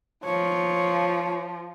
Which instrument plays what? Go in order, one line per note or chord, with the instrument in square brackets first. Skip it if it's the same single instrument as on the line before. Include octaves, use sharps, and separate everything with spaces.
[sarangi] F3 [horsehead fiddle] C#5